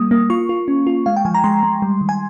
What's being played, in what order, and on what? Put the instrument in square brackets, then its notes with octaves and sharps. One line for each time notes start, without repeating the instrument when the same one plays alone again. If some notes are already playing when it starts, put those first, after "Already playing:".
Already playing: [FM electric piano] G3 A#3 D#6
A#3
F4 C#6
F4
C#4
F4
G#3 F5
G5
F3 G#5
A#5
G#3 C6
G#3
G3
D#3
G#5